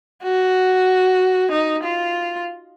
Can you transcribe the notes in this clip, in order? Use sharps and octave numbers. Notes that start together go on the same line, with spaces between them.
F#4
D#4
F4